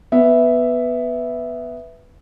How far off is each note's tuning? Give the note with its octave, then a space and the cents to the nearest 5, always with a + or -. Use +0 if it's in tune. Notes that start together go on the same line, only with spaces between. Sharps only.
B3 +0 E5 +0